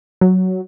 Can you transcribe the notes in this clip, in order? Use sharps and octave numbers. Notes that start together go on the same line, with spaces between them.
F#3